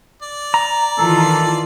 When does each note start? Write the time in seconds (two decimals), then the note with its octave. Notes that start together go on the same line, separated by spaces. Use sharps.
0.22 D5
0.54 A#5
0.98 D#3 E3 F4 A4